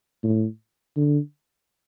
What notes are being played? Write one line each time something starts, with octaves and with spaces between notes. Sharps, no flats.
A2
D3